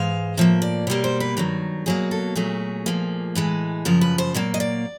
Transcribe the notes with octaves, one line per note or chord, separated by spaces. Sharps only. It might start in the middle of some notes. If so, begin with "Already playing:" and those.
Already playing: G#2 E3 G#3 F5
A2 F3 A#3 E5
D5
B2 G3 A#3 C#5
C5
B4
G2 D#3 F#3 A#4
B2 F#3 A#3 G#4
A4
A#2 F#3 A3 G#4
A#2 F3 A#3
A2 E3 G#3
F#2 C#3 F3 A#4
B4
C5
A#2 F#3 A#3 D5
D#5
D5